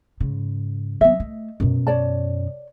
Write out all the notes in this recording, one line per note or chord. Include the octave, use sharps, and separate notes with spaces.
G#2 C#3
F#3 B3 D#5 E5
A3
F#2 B2
C#5 D5 A5